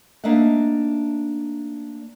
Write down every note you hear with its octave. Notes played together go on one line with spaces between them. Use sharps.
A3 A#3 D4 D#4 E5 F#5